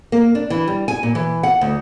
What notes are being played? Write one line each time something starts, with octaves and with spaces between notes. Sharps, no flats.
A#3
D4
E3
G3
G#5
A#2
E3
F#5
D2